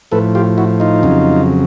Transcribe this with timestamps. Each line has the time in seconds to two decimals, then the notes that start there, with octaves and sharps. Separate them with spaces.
0.12 A2 F3 A4 B4
0.35 F4 G4
0.57 E4 F#4
0.80 D#4 F4
1.03 F2 C#3 F#3